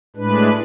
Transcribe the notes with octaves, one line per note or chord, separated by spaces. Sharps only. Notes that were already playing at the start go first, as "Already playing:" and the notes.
A2 G#3 D4 B4